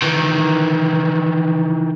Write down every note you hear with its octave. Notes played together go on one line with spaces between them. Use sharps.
D#3 E3